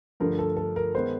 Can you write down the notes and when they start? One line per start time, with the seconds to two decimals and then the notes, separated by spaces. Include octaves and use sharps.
0.20 G2 D3 F3 A3 A#4
0.39 A4
0.57 A4
0.76 A#4
0.95 D#3 G#3 B3 C5